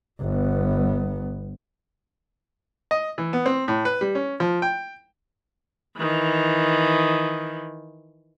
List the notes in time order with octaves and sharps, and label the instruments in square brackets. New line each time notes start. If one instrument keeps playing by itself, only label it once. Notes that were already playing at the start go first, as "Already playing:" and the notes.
[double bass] G1 B3
[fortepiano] D#5
E3
B3
C4
A2
B4
G3
C#4
F3
G5
[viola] D#3 E3